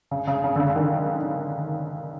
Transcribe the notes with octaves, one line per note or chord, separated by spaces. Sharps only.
C#3
C#3
C#3
D3
C#3
D#3